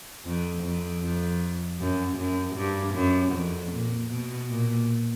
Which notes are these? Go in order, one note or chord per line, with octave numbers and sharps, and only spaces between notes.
F2
F2
F2
F#2
F#2
G2
F#2
F2
A#2
B2
A#2